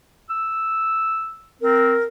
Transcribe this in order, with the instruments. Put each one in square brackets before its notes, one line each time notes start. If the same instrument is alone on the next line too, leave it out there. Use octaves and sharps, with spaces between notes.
[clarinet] E6
[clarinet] C4 [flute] A#4